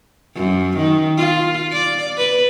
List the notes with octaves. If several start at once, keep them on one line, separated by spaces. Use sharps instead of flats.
F#2
D#3
F4
D5
B4